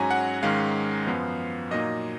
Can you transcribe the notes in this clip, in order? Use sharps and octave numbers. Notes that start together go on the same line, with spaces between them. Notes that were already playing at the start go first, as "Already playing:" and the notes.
Already playing: G#2 F#3 C#4 G#5 A#5
F#5
G#2 D#3 G#3 C#4 F5
F#2 F3 B3
A#2 F#3 A#3 D#4 D#5